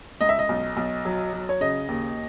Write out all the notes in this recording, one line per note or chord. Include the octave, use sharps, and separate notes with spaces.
C#2 D#5
E5
D#5
B1
B1
F#3
F#3
C#5
C#3 D#5
D#2